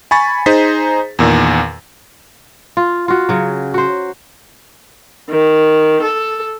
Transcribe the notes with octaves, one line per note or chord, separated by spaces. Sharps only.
G#5 B5 C#6 A6
D#4 G#4 C5 A#5 B6
E2 A#2 D#3
F4
F4 F#4
C#3 F#3
F#4 C5
D#3
A4